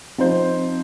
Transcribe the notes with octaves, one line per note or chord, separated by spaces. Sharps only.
F3 C4 D#4 C5